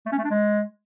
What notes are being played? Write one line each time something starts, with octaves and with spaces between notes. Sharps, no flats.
A3
C#4
A3
D4
G#3